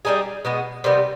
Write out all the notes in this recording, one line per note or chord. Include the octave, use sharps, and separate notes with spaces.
G3 A#3 D#4 G#4
B2 G#3 B3
C3 D#3 G3 B3